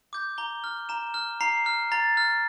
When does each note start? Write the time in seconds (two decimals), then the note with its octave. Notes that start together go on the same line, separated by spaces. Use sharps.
0.13 D6 G6
0.38 A#5 G7
0.64 F6
0.89 A#5 E7
1.14 F6
1.41 A#5 C7
1.66 F6
1.92 A#5 A6
2.17 F6